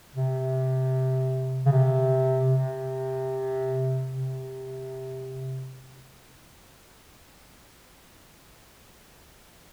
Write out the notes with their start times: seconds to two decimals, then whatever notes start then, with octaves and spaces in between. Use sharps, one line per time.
0.15 C3
1.65 C#3
1.72 C3
2.51 C3
4.08 C3